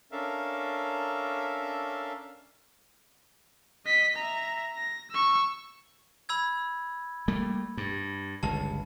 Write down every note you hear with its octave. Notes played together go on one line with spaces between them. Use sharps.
C#4 D4 A4 A#4 E5 F5
D#5 B6
E5 A#5
A#6
C#6 E6
B5 E6 G#6
G3 A3 A#3
G2
G1 C#2 A5